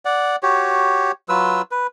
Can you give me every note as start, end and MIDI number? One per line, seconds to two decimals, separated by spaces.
0.05 0.36 74
0.05 0.36 78
0.43 1.12 66
0.43 1.12 67
0.43 1.12 73
1.29 1.62 54
1.29 1.62 65
1.29 1.62 71
1.29 1.62 88
1.71 1.87 71